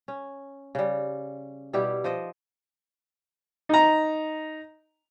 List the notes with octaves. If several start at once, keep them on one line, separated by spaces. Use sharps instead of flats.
C#4
C#3 G3
B2 G3 E4 G4
F3 C5 D#5
D#4 A#5